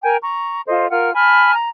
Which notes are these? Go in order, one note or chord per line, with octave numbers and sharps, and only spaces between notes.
A#4 G5 G#5
A#5 C#6
F4 A4 C5 D#5
F4 A#4 F#5 F6
G#5 A5 B5 F6
A#5